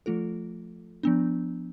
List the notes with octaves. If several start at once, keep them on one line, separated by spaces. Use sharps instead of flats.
F3 A3 F4 A4
F3 B3 D4